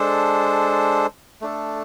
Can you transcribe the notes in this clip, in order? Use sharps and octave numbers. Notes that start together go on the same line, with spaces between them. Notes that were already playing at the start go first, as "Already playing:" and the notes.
Already playing: G#3 D4 A4 C5
A3 D4 A4